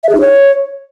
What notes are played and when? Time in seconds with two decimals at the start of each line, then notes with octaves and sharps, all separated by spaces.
0.04 E5
0.09 G#4
0.15 D#4
0.21 C#5